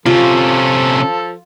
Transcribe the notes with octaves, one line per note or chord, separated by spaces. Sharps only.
C3 F3 C#4 F4 A4